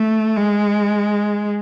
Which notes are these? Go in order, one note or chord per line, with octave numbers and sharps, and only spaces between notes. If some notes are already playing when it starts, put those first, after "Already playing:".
Already playing: A3
G#3